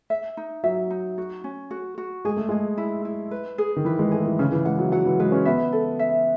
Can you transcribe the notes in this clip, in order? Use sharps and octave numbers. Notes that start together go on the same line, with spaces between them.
E5
D#4
F#3 E5
D#4
F#4
C#4
F#4
F#4
G#3 G#4
A3
G#3 G#4
E4
E4
B4
G#4
D#3
E3 B4
G#3
A3 G#4
E3
C#3 C#4
E3
G#3 F#5
F#3
F#3 F#5
E3
G#3 B4
C#4
B3 E5
A4
E5